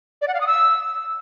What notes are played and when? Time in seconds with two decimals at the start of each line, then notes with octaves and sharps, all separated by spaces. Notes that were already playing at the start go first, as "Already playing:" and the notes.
0.22 D5
0.28 F#5
0.34 F5
0.41 D#6
0.47 E6